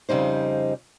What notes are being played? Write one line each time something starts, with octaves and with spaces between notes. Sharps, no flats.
F2 C#3 G3 D#4 C5